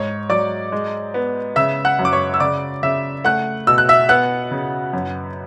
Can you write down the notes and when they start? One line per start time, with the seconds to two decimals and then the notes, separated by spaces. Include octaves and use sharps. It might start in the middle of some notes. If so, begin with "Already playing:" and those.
Already playing: G#2 C#5
0.30 F#3 D5 D6
0.72 G#3
1.14 B3
1.56 C#3 E5 E6
1.85 F#5 F#6
1.99 F#2
2.05 D6
2.13 C#5 C#6
2.34 E6
2.40 C#3 D5 D6
2.83 C#3 E5 E6
3.25 A3 F#5 F#6
3.67 B2 E6
3.78 F#6
3.89 E5 E6
4.09 B3 F#5 F#6
4.51 C#3
4.93 F#2